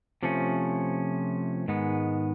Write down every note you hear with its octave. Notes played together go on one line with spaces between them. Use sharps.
C3 F3 A3 C#4
G#2 D#3 G#3 B3